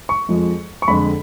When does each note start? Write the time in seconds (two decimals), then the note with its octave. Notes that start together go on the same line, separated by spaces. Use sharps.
0.09 C#6
0.29 F2 F3 G#3
0.82 C#6
0.88 F2 D3 G#3 B5